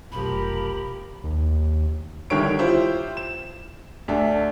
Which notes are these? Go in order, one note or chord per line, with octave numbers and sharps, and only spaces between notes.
F1 B1 F3 G4 A#4 B5
D#2
C2 D3 D#3 C#5 D7
E4 F4 G4 C5
E7
D2 D4 E5